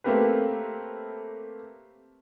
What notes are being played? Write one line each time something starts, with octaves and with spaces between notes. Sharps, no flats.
A3 A#3 C4 G4 A#4 B4